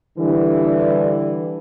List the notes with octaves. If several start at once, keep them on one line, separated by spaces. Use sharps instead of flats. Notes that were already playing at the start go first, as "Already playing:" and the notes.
D3 E3 G3